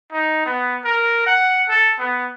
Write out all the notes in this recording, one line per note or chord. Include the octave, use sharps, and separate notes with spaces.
D#4
B3
A#4
F#5
A4
B3